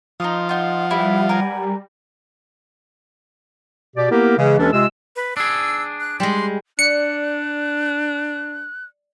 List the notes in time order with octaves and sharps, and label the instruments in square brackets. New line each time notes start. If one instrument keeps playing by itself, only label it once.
[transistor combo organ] F3 [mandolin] D#4 C6 D#6
[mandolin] D#4 F4 [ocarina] F#5
[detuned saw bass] G3 [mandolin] E4 B4
[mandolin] A#4 B4 G#5
[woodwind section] B2 G4 D5
A#3 B3 E4 G4 A#4
C#3 E3 G#3
D#2 E3 G#3 C#4 D4 A4
C3 G#3 F4 E6
[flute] B4
[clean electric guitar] D4 G#4 [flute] E6
[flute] F#6
[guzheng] G3 G#3 [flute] C6
[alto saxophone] D4 [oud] D5 [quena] F#6 [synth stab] C#7